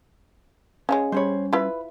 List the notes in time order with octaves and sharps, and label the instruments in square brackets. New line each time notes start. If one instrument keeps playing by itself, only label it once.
[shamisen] C#3 F3 G#3 [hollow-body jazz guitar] C#4 C#5
[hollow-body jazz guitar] G3 C#4 B5 [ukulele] C5 C#5
[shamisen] E4 F4 [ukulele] B4